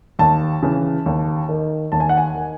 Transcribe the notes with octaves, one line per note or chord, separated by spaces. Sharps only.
D#2 A5
C#3 E3
D#2
D#3
D#2 A5
G#5
F#5
G#5
D#3